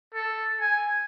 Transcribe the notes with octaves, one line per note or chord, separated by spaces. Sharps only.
A4
G#5